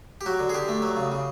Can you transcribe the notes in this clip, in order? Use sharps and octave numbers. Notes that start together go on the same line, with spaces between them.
G4
F#3 F#4
D3
G#4
D3 G4
A3
F#3
C#3
C#3